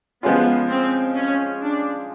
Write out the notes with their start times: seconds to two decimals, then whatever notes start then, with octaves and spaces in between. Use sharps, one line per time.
0.22 F3 G#3 B3 C#4 F4
0.69 C4
1.16 C#4
1.62 D4